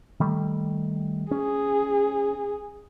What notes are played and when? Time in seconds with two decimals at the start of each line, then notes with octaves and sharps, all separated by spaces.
0.20 D#3 G3 A3
1.31 C#4 G#4